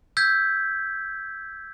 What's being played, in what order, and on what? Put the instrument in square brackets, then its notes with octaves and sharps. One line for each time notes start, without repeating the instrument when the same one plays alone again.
[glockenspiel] E6 G6 G#6 B6